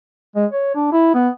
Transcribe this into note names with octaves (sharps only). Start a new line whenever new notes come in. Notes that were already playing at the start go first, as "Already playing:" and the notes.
G#3
C#5
D4
E4
B3